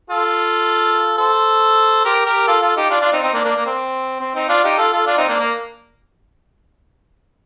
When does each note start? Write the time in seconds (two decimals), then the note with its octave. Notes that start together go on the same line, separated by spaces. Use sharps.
0.10 F4 A4
1.18 A4 C5
2.05 G4 A#4
2.26 G4 A#4
2.47 F4 A4
2.62 F4 A4
2.76 D#4 G4
2.90 D4 F4
3.01 D4 F4
3.12 C4 D#4
3.23 C4 D#4
3.34 A#3 D4
3.45 A#3 D4
3.56 A#3
3.66 C4
4.21 C4
4.35 C4 D#4
4.49 D4 F4
4.64 D#4 G4
4.78 F4 A4
4.92 F4 A4
5.06 D4 F4
5.17 C4 D#4
5.28 A#3 D4
5.40 A#3